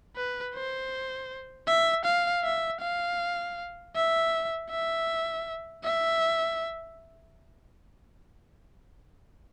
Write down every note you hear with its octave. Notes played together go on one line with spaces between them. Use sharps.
B4
C5
E5
F5
E5
F5
E5
E5
E5